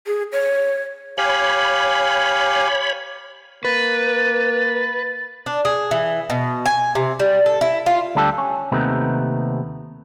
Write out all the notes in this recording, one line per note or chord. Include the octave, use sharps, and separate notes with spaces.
G#4
C#5
G4 C#5 F5 G#5 B5
A#3 B4 A6
D4
G#4
E3
B2
G#5
C3
G3
A4
E4
F4
D2 G3 D4 G4 A4
C#4
D#2 C3 A3 B3 D#4